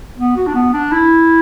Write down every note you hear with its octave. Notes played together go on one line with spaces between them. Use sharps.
B3
F#4
D4
B3
D4
E4